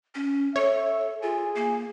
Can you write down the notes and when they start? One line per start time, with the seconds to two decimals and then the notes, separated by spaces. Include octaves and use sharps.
0.15 C#4
0.56 A4 C#5 E5
1.22 F4 G#4
1.56 A#3